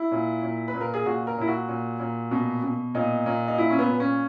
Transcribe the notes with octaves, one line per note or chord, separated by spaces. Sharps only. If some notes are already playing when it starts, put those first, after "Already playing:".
Already playing: E4
A#2
A#2
B4
A#2
A#4
G#4
A#2 F#4
A#4
A#2 E4
F#4
A#2
A#2
B2
B2
A#2 D#4
A#2
D#4
A#2 E4
C#4
B3
A#2
C#4